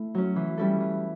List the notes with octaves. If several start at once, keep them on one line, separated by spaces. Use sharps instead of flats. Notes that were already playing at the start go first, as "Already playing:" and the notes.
Already playing: A3 E4
F#3 C#4
E3
G3 C#4 E4 A4
E3